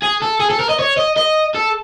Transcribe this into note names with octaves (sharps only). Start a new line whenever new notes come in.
G#4
A4
G#4
A4
A#4
D#5
C#5
D#5
D#5
A4